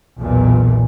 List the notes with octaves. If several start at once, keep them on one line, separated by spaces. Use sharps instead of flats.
B1 E2 A#2